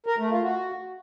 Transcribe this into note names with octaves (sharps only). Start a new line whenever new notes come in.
A#4
A3
F4
F#4